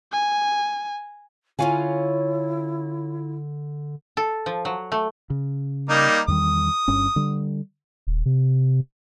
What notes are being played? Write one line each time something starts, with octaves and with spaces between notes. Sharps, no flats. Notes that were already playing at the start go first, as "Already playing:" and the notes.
G#5
D3 C#4 E4 F4 C#5 F5 F#5 G#5
A4
F3
F#3
A3
C#3
G3 A#3 D#4
E2 D#3 G3 D#6
G1 G2 C#4
D3 G3
D#1
C3